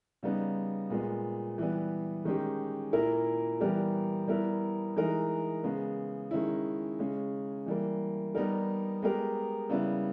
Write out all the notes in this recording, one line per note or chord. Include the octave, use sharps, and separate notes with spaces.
C#3 G3 B3 D#4
A#2 G#3 B3
E3 G3 B3
D#3 G#3 C#4 G4
A#2 A#3 E4 A#4
E3 G3 B3 G4 A#4
G3 B3 E4 A#4
E3 G#3 D#4 A#4
C#3 G#3 B3
D#3 G#3 C#4 E4
C#3 G#3 C#4
E3 G3 A#3
G3 B3 D#4 A#4
G#3 B3 G4 A#4
C#3 G3 B3 E4